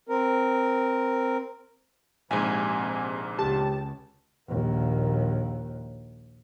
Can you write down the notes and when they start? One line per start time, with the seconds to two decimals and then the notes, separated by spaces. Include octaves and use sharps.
0.09 C4 A#4
2.31 A#1 G#2 C3 G#5
3.39 C#2 G4 A5
4.47 A#1 D#2